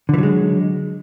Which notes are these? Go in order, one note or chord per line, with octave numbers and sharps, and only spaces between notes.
D3 E3 F#3 G#3